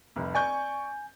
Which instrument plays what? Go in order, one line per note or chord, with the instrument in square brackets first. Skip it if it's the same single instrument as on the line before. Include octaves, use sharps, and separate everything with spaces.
[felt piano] F1 C2
[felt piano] D5 C#6 G6 [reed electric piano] G#5